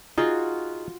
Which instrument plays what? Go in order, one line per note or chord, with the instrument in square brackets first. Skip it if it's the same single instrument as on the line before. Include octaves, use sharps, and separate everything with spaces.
[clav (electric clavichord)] D#4 G#4 [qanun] F4 F#4